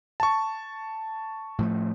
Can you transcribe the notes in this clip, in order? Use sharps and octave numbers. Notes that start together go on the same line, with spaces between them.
A5 C#6
A2 F3 A3